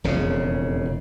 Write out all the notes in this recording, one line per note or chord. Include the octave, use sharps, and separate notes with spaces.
E1 F2 C#3